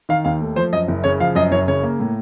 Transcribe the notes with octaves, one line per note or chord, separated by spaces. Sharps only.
D#3 F5
D#2 F5
A3
F3 C5
F#2 D#5
F#1
C#3 C#5
F3 F5
F#2 D#5
F#1 C#5
C#3 C#5
A#3
A2